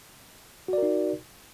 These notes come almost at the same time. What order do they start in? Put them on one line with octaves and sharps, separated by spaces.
F#4 D5 A#4 D#4